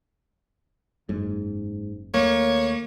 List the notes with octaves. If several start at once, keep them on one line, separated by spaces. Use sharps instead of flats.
F#1 G#2
D#2 A3 A#3 C#5